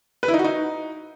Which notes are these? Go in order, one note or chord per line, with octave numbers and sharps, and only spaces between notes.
B4
E4
D#4
F#4
D#4